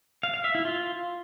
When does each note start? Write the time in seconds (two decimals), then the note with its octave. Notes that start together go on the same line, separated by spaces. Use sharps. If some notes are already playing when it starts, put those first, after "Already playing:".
0.23 F5
0.34 F5
0.44 E5
0.55 E4
0.65 F4